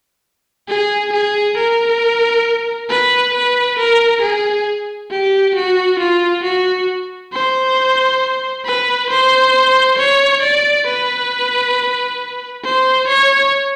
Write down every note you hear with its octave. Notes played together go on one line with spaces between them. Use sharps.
G#4
G#4
A#4
B4
B4
A#4
G#4
G4
F#4
F4
F#4
C5
B4
C5
C#5
D5
B4
C5
C#5